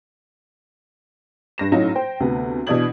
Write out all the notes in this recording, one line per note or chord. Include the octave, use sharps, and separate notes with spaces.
G2 A#6 E7
A2 F#3 C#4 D#4 F4
C5 G5
D2 C3 B3
B2 E3 D4 D#6 G#6 F#7